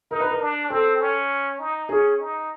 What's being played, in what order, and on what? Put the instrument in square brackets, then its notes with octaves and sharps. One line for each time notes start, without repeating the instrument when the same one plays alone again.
[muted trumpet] D#4 [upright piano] A#4
[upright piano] B4
A#4
[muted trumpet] D4
[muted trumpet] C4 [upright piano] A4
[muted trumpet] C#4
D#4
[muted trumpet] C#4 [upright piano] G#4
[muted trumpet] D#4